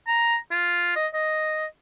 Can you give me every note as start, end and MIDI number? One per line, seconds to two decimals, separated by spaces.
0.08 0.37 82
0.51 0.91 65
0.96 1.07 75
1.14 1.66 75